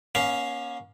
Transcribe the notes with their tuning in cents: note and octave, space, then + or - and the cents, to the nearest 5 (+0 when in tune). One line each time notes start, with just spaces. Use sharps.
A#3 +45 C#4 +10 F5 -5